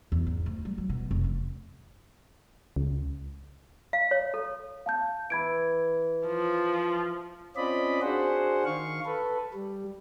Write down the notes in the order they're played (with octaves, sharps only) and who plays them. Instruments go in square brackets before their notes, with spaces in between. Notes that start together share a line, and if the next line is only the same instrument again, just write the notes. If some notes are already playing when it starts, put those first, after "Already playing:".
[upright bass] E2
G#2
D2
G3
F#3
B2
F1
E3
[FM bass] C#2
[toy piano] F5
C#5
A4
[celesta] F5 A5 G6
[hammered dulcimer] E3 E4 [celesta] B5 G#6 D7
[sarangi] F3
[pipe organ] C4 C#4 F4 D5 D#5 B5
D4 F#4 G#4 C5 F#5
D#3 F5 C#6
A4 B4
G3